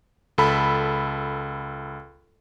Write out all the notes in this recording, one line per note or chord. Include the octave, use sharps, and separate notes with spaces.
C#2 A4 B5